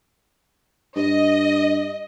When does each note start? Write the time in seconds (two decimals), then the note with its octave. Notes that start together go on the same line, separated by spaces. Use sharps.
0.96 G2 D#5